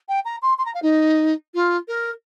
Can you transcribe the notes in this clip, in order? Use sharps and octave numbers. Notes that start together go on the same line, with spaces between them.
G5
A#5
C6
C6
A#5
F5
D#4
F4
A#4